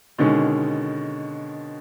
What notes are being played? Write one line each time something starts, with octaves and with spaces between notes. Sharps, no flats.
B2 D3 D#3 G#3 C#4